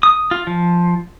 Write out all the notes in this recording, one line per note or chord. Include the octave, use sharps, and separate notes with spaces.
D#6
F4
F3